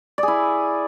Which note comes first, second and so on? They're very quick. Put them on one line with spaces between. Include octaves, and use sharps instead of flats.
D5 G#4 E4